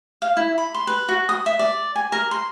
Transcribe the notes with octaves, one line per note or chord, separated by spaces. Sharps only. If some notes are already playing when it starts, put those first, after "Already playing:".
F5
E4
B5
C6
B4
F#4
D#6
E5
D5
G#5
A#4
C6